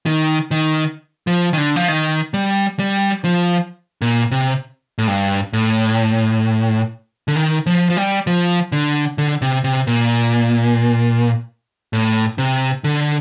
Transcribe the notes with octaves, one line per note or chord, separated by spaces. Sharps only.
D#3
D#3
F3
D#3
D3
F3
D#3
G3
G3
F3
A#2
C3
A2
G2
A2
D3
D#3
F3
F3
G3
F3
D3
D3
C3
C3
A#2
A2
C3
D3